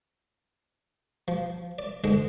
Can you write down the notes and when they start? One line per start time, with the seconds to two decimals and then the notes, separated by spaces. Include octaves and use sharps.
1.28 F3
1.79 D5
2.04 G#2 D3 G#3